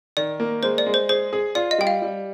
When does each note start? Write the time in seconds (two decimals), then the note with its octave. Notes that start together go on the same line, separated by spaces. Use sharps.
0.17 D#3 D5
0.40 A#3
0.63 G#3 C5
0.78 D5
0.86 G#3
0.94 C5
1.09 G#4 C5
1.33 G#4
1.55 F4 D5
1.71 D#5
1.78 G3 G5
1.87 F5
2.02 G3